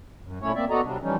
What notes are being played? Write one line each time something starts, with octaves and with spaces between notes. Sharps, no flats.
F#2
A#2 A3 C#4 E4 C#5
A#3 C4 D5 E5
B3 F#4 A4 D5 D#5 A#5
C3 F#3 G3 D4
E3 F3 G3 C#4 D#4